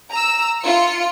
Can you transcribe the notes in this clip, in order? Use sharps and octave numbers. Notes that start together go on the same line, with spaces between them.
A#5 E6
F4 C#7